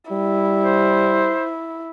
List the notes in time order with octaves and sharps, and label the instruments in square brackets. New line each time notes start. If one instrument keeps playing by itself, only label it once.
[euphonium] G3 [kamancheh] E4
[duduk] C5